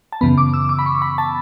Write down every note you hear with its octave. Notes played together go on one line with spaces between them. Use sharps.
A5
F#2 C#3 E3 B3 B5
D6
E6
D6
B5
C#6
B5
A5